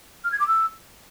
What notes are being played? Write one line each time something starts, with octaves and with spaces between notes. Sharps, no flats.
F6
G#6
D6
E6